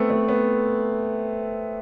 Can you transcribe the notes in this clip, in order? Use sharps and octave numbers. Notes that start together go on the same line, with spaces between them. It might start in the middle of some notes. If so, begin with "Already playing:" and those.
Already playing: A3 B3 C4
A3
B3